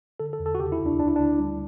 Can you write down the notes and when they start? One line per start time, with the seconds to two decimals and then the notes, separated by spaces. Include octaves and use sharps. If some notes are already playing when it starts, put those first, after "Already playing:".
0.20 D3 A4
0.33 A4
0.39 E2
0.46 A4
0.55 F#4
0.60 C#3 G4
0.72 E4
0.80 D2
0.86 D4
0.99 D2 D4
1.08 E4
1.16 D2 D4
1.39 G3